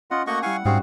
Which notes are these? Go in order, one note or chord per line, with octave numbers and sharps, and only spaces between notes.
C#4 F4 D#5 F#5
A3 A#3 F#4 D#5 F#5 C#6
G3 E4 F5 F#5 G#5 C#6
G#2 G3 C4 C#4 F#4 G#4 F5